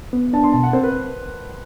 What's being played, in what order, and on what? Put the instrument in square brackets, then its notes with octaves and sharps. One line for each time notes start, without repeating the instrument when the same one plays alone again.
[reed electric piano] B3
[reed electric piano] D4 [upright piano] A5
[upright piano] C6
[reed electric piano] B2 [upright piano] A5
[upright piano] F#5
[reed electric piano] C4 [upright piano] C5
[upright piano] B4